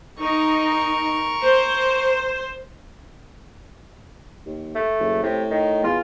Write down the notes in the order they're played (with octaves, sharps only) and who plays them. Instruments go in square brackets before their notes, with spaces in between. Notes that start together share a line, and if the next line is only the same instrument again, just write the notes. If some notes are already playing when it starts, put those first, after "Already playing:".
[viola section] D#4 [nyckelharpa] A#4 C#6
[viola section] C5
[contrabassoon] D#2
[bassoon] A3
[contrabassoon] F#1
[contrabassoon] A2 [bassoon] C3
[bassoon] D#3
[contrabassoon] E2 [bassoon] F4